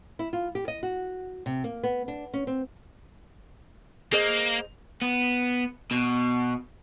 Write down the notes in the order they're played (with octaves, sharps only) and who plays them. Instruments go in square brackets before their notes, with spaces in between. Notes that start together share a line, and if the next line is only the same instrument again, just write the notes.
[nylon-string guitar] E4
F4
G4
D#5
F#4
C3
A#3
B3
D4
C#4
C4
[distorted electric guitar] A#3 [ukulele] G#4 C5 D#5
[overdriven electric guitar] B3
B2